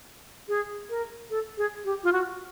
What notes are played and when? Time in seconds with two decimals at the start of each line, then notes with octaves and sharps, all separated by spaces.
0.49 G#4
0.90 A#4
1.30 A4
1.58 G#4
1.85 G4
2.04 F4
2.13 F#4